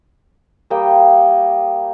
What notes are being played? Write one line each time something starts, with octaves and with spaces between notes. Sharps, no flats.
G3 A#3 D#5 G5